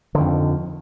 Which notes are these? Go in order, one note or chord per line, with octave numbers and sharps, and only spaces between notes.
F2 D3 D#3